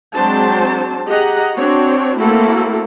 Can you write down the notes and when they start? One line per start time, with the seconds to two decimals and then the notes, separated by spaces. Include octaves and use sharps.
0.15 F#3 G#3 C4 D4 C5 A5
1.07 G4 G#4 D#5 F#5 A#5
1.56 C4 D4 F#4 C#5
2.19 A3 A#3 C4 E4 F#4 A4